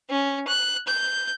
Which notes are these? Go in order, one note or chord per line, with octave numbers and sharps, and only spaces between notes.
C#4
F#6
G6